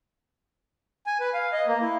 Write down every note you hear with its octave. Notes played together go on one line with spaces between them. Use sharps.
G#5
B4
F5
D#5
A#3
E4